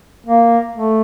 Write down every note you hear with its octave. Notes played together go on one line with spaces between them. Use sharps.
A#3
A3